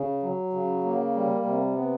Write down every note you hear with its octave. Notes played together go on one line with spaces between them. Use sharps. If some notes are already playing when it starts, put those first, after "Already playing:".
Already playing: C#3
F#3
C#3
A#3
G3
C3
B3